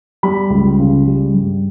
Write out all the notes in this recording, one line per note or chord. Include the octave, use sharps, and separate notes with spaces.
G3 B5
C#2
C#3
G3
G2